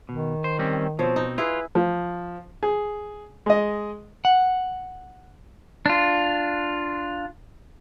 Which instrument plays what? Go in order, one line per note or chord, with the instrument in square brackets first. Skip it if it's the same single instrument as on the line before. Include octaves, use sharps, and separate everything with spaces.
[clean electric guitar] B2 [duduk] D#3
[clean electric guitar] C5
G3 C4 C#4
[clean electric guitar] B2 C4 [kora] F3 C#5
[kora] D#4
[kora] E4 G#4 [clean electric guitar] F4 [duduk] B4
[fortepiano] F3
G#4
G#3 D#5
[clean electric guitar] F#5
[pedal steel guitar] D4 F4